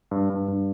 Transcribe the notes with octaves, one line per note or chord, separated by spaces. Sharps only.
G2
G2
G2